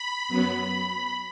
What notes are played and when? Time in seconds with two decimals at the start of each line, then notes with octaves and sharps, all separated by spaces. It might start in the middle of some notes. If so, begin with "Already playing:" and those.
Already playing: B5
0.28 F#2 F#3 B3